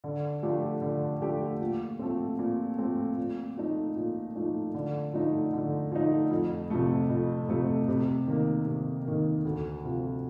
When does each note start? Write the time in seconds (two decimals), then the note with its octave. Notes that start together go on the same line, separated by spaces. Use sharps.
0.04 D3
0.43 F3 A3 D4 G4
0.82 D3
1.22 F3 A3 D4 G4
1.61 A#2
1.99 F3 A3 C4
2.39 A#2
2.78 F3 A3 C4
3.17 A#2
3.57 F3 A3 D#4
3.96 A#2
4.35 F3 A3 D#4
4.74 D3
5.14 F3 A3 D#4
5.53 D3
5.92 F3 A3 D#4
6.31 F2
6.70 C3 F3 A3
7.10 F2
7.49 C3 F3 A3
7.88 C3
8.27 D#3 A#3
8.67 C3
9.05 D#3 A#3
9.45 D2
9.84 C3 F3